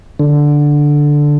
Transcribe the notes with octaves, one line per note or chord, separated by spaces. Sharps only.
D3